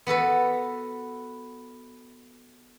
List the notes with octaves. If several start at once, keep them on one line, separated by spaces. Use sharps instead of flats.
B3 F#4 A4 B4